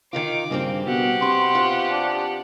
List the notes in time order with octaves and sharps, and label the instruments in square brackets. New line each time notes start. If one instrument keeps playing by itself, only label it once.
[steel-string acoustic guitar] D#3 D#4 F4 [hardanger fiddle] D6
[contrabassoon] G2 [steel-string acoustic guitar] C#3 A#3 C4
[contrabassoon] B2 [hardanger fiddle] G4 F#5
[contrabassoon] C3 [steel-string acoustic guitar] B4 [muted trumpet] C6
[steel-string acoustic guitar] F4
[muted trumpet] D4